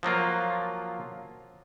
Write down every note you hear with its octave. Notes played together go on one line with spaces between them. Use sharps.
F3 F#3 A#3 F4